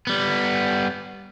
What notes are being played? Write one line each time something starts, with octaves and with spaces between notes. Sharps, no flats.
G3 B3